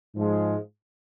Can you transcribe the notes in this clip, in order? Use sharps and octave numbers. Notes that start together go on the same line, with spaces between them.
G#2 F3 G#3